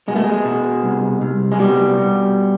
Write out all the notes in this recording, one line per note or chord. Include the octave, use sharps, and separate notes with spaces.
B2 G#3
A3
G#3
B2
C2
C2
G#3
B2 G3
B2